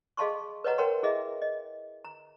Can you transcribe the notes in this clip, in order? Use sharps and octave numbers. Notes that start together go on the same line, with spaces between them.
G#4 D#5 F5 A5 C6 C#6
B4 C#5 D#5 F#5 A#5
A#4 C#5 F#5 G5 A#5 C6
E4 G#4 D#5 E5
D#5
A#5